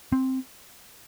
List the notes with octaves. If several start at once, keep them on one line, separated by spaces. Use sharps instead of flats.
C4